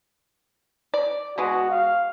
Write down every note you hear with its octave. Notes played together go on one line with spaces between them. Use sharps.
D5
B2 G#3 B3 F#4
F5